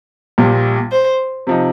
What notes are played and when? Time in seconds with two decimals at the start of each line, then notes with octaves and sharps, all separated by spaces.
0.38 A#1 A#2 G3
0.92 C5
1.47 C3 F3 D#4